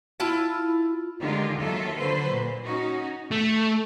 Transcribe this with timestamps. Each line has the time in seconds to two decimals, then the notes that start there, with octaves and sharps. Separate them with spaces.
0.20 E4 F4 A5
1.21 D3 D#3 G#3 D#4 F4 G4
1.57 D#2 D#3 F#3 F4 A4 E5
1.95 D3 F#3 B4 C5
2.30 A#2
2.64 C#4 D#4 F#4
3.31 A3